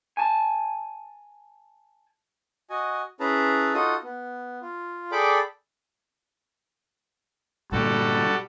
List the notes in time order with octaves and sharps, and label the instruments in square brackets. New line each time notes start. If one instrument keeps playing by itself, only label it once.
[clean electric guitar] G#5 A5
[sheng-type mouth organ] F#4 D#5 G#5
C#4 E4 G#4 B4 A5 A#5
D#4 F4 F#4 A4 D#5 D#6
B3
F4
G#4 A4 D5 G5 B5 D6
[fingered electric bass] G2 A#2 D3 [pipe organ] G3 F#4 A4